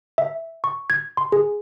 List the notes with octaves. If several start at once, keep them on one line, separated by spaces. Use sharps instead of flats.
E5
C#6
G#6
C6
G#4